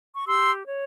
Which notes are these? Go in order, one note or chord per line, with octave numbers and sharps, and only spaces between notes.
C#6
G4 C6 E6
C#5